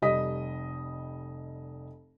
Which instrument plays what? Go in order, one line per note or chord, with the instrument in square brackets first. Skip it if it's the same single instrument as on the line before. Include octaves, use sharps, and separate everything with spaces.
[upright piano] F1 G3 D#5 D#6 B6